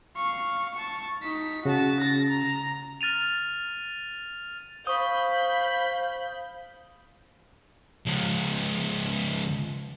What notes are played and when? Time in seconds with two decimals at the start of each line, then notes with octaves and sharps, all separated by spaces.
0.16 F5 C#6
0.74 A5 C#6
1.23 D#4 B6
1.65 C#3 F#4 A5
2.00 A6 A#6
2.30 A#5
3.01 F6 A6 D#7 F7
4.87 C5 F5 B5 C#6 D#6 G6
8.06 C#2 F3